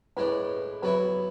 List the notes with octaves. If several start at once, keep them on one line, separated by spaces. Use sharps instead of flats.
A2 G#3 D4 B4
F#3 B3 E4 B4